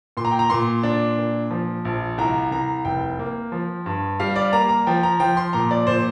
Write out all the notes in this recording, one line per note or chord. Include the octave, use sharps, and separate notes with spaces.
A#2 C6
A#5
G5
A#5
A#2 C6
D4
A#2
F3
A#1
C2 A#5
C2 A#5
F1 G5
A#3
F3
G2
G3 F5
D5
A#3 A#5
A#5
F3 G5
A#5
F3 G5
C6
A#2 A#5
D5
A#2 C5